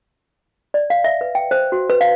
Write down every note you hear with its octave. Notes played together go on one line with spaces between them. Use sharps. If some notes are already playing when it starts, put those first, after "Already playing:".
D5
F5
E5
B4
G5
C5
F#4
B4
F5